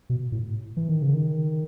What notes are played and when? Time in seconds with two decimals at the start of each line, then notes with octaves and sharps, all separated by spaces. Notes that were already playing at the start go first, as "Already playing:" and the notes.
0.10 B2
0.32 A2
0.77 E3
0.89 D#3
1.02 C#3
1.14 D#3